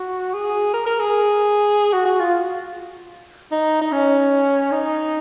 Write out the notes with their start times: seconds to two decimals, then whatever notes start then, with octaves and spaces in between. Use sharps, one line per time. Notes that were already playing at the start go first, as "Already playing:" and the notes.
Already playing: F#4
0.34 G#4
0.74 A#4
0.86 A#4
1.00 G#4
1.93 F#4
2.05 F#4
2.20 F4
3.52 D#4
3.81 D#4
3.92 C#4
4.72 D#4